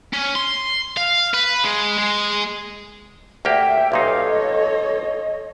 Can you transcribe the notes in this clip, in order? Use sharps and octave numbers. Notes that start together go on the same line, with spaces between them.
C#4
C6
F5
B4
G#3
G#3
D2 A#3 G4 E5 G5
B1 A#2 D#4 G4 A4 C#5 F5
D#5